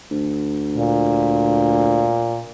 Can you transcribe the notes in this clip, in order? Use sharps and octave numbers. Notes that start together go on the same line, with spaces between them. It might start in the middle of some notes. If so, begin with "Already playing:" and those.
D2
A#2